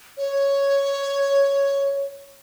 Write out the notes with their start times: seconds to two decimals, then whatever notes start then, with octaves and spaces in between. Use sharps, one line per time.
0.17 C#5